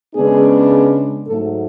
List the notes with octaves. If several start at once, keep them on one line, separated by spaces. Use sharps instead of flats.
C#3 G#3 B3 D4 G#4
G#2 F#3 A3 A4